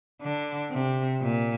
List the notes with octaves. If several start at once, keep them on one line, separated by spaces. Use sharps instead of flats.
D3
C3
A#2